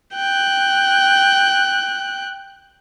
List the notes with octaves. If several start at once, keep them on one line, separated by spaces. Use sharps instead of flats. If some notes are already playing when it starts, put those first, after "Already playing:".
G5 F#6